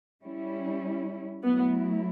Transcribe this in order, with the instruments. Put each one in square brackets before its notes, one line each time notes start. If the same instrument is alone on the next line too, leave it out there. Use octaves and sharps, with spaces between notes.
[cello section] G3 C#4 E4
[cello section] F#3 A3 E4 [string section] B3